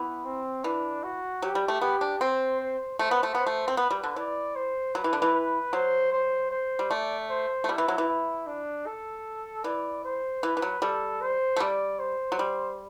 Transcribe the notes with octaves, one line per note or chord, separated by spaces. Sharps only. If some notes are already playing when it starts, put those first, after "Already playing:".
Already playing: E3 B3
C4
E3 D4
F#4
F#3 G4
G3
A3
B3 G4
D4
C4 C5
C5
A3 C5
B3
A3
B3 C5
A3
C4
B3 B4
G3
D3
E3 D5
C5
F#3 B4
E3
D3
E3
B4
F#3 C5
C5
C5
G3
A3 D5
C5
A3
G3 E4
E3
F#3
E3
E4
D4
A4
E3 D5
C5
E3 B4
E3
F#3
G3 A4
C5
A3
G3 D5
C5
F#3
G3